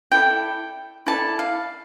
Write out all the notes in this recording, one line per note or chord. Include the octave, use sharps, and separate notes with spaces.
E4 A4 D5 G5
E4 A4 D5 A5
F5